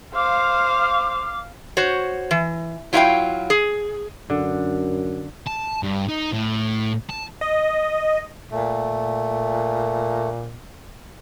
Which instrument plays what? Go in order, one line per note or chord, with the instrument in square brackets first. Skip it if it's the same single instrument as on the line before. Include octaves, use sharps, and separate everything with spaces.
[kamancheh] C5 [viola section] F5 [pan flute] D6
[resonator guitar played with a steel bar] F#4 C5 C#5
E3
F#3 E4 F4 E5 F5 G5
G#4
[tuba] F#2 [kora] D3
[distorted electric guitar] A5
G2
D#4
A2
A5
[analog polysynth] D#5
[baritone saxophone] A#2 [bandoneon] A3